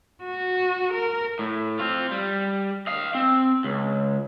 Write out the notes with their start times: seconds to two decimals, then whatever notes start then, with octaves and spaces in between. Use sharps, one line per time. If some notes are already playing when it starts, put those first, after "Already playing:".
0.23 F#4
0.93 A#4
1.39 A2
1.79 C4 F4
2.11 G3
2.87 D#5 F5
3.15 C4
3.64 C#2